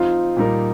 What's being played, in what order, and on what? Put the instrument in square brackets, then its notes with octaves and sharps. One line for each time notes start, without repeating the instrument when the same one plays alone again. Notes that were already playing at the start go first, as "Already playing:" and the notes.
Already playing: [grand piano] F3 C4 D#4 [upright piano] F4
[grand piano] A#2 G3 D#4 A#4